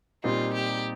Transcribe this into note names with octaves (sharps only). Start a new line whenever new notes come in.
A#2 G3 C4 D#4 F4
G4